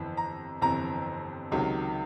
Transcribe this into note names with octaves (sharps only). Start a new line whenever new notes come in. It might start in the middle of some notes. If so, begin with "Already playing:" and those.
Already playing: G1 F2 C3 E3
A#5
G1 F2 C3 E3 A#5
C#2 C3 D#3 F#3